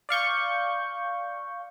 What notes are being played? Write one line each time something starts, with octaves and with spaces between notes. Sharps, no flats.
D5 F5 C#6 G6